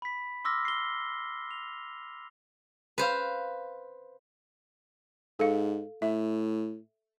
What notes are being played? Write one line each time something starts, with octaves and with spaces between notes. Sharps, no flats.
B5 B6
C6 D6 E6 F6 A#6
C7 G7
F7
B4 C5 F5
G#2 A4 F5
A2 E5